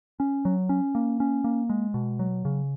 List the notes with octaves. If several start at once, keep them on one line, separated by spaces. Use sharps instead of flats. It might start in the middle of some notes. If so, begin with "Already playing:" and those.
C#4
F#3
C#4
A#3
C#4
A#3
G#3
B2
F#3
C#3